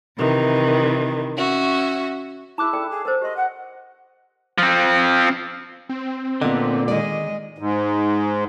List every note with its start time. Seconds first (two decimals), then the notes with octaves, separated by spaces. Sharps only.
0.18 C3 D#3 E3
1.38 C#4 F#4 E5
2.58 D#4 E4 G#4 A5 D6 F#6
2.73 A4 D5 G5
2.90 G#4
3.05 A4 A#4 C5
3.22 G4 D#5 C6
3.36 F#5
4.58 F3 C4
5.89 C4
6.42 A#2 D3 B3 D#5
6.88 D#3 G#3 D5 D#5
7.58 G#2